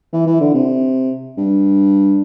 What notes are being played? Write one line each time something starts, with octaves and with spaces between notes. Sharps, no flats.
E3
E3
D3
C3
G2